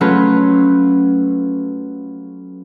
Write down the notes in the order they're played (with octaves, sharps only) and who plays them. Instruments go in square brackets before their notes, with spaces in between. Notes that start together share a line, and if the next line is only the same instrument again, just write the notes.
[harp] F#3 A3 C#4 F4 B4